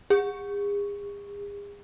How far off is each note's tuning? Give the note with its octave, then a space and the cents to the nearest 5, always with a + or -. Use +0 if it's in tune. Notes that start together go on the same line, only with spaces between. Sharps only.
G#4 -40